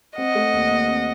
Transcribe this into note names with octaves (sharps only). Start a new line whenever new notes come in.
C4 D#5 F#5
A3
D#2
D#2
C4